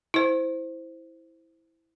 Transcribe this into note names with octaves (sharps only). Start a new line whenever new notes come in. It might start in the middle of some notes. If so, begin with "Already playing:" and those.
E4 C5